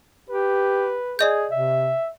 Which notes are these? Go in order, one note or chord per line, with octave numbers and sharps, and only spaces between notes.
G4 B4
G#4 D5 D#5 G6
C3 E5